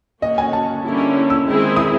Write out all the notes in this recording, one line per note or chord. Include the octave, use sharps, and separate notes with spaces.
A#3 C#4 F#4 D#5
G#5
A5
D3 G3 A#3 C#4 E4
E6
D#3 G#3 C4 E4 G#4
D#6